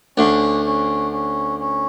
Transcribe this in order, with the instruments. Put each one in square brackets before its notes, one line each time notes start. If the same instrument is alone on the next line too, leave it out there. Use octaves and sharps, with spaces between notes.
[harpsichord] D2 D3 [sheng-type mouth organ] C#4
[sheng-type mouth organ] C#4
C#4
C#4